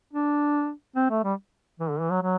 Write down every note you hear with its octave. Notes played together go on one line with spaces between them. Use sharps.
D4
C4
A3
G3
E3
D3
E3
F#3
F#3